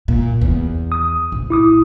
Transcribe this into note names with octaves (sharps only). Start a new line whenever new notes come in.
A#2
E2
D#6
A#1
E4 D6 D#6